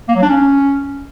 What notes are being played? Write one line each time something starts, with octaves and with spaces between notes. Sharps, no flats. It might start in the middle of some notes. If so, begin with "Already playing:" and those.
A#3
F#3
D4
C#4